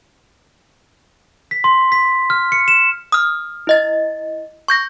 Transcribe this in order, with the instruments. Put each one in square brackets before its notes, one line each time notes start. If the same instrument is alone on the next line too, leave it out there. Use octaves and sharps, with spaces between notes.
[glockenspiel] B6
C6
B6
F6
C#7
E7
[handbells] D#6 F6
E4 D#5 A6
C#6 G6 A#6